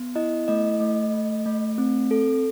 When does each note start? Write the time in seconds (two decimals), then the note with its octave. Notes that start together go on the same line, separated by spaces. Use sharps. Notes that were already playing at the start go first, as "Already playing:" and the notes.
Already playing: B3
0.15 E4 D#5
0.48 A3 D#5
0.80 A3
1.13 A3
1.46 A3
1.78 C4
2.11 A4